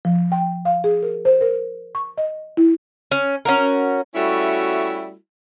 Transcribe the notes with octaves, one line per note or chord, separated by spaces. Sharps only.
F3
G5
F5
G#4
A#4
C5
A#4
C#6
D#5
E4
C#4
C#4 F#4 A#4
G3 A3 C#4 E4 F#4